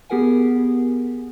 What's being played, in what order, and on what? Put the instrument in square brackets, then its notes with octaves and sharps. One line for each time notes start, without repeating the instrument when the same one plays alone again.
[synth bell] B3 G4 G#4 A#4 F#5 G#5